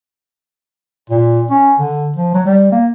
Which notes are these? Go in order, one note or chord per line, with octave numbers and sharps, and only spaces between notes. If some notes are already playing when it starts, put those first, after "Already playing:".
A#2
C#4
D3
F3
F#3
G3
A#3